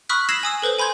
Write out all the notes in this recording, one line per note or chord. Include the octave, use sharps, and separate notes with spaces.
B5 C#6 D#6 F6 F#6 B6
E6 G#6 A#6 C7 E7 F#7
G#5 D#6 E6
A4 B4 C5 G6
G#5 B5 C6 G6 G#6